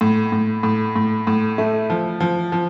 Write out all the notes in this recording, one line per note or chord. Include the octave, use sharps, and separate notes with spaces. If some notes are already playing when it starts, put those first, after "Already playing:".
A2
A2
A2
A2
A2
A3
F3
F3
F3